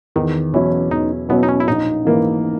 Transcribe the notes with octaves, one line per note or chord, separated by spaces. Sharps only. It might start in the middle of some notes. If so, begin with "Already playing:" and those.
E2 D#3
B2 E3 F#3 C#4 E4
E2 D#4
B2 F#3 B3 C#4 E4
D#4
C#4
E4
A#1 D#4
G#2 E3 A#3 E4